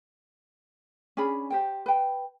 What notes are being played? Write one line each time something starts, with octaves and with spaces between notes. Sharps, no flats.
C#4 D4 G#4 B5
G4 C5 G5
B4 G5